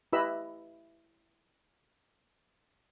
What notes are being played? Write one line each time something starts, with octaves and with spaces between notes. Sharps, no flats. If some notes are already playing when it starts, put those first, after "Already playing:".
E4 G4 B4 D#5 B5 E6